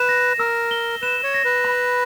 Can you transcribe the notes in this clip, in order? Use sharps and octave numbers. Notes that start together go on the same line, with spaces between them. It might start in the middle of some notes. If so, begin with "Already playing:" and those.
Already playing: B4 E7
A#6
A#4 E6
G7
B4 E7
C#5
A#6
B4
B5